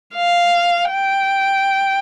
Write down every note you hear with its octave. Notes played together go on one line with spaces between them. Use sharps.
F5
G5